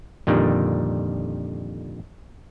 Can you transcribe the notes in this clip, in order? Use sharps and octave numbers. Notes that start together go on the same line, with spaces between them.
F2 A#2 D3 D#3 G3